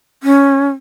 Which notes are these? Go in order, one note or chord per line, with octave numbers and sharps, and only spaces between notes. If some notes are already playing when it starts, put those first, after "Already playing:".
C#4